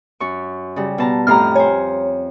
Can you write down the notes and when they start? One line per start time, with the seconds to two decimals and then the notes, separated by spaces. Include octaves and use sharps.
0.20 F#2 C#6
0.76 C#3 G3
0.98 B2 A5 A#5
1.27 F2 A2 G4 A#5 F6
1.55 C5 C#5 G#5